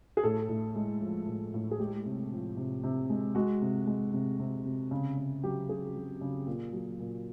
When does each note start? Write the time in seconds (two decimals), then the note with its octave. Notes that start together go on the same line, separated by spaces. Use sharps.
0.17 G#4
0.23 A2 A4
0.49 A2
0.75 G#3
1.01 F3
1.27 A2
1.54 A2
1.71 G#4
1.80 G#3 G4
2.06 C3
2.32 F3
2.57 C3
2.83 C3
3.10 G#3
3.35 G#3 F#4
3.61 C3
3.87 G#3
4.13 C3
4.39 C3
4.65 C3
4.91 C#3
5.18 C#3
5.44 F#3 G4
5.69 C#3 G#4
5.95 F#3
6.21 C#3
6.47 A#2
6.73 F#3
6.99 A#2